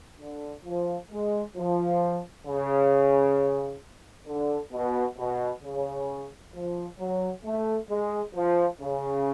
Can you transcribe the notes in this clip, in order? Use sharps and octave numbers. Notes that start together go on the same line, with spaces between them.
D3
F3
G#3
F3
C#3
D3
B2
B2
C#3
F3
F#3
A3
G#3
F3
C#3